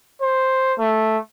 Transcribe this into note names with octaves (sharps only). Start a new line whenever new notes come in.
C5
A3